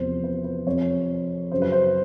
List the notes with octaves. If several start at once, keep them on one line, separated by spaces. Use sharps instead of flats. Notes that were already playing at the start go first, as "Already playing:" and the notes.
Already playing: E2 C3 F3 C5
B4
B4
F2 C3 F3 C#5
F#2 C#3 F#3 C5
B4
C5